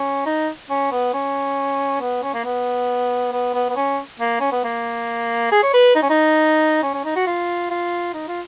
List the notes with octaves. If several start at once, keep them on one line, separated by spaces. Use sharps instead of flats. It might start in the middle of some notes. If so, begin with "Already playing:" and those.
Already playing: C#4
D#4
C#4
B3
C#4
B3
C#4
A#3
B3
B3
B3
B3
C#4
A#3
C#4
B3
A#3
G#4
C#5
B4
D#4
C#4
D#4
C#4
C#4
D#4
F#4
F4
F4
D#4
F4